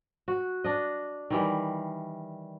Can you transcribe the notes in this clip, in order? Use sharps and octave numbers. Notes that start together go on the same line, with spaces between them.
F#4
D4 D#5
D#3 E3 G3